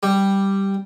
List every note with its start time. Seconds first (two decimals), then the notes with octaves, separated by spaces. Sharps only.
0.03 G3